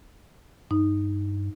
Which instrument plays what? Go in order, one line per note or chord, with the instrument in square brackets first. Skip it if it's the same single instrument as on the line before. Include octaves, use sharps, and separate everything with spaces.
[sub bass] G2 [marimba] D#4